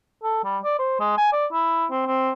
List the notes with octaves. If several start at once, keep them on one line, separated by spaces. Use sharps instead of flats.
A4
G3
D5
C5
G#3
G#5
D5
E4
C4
C4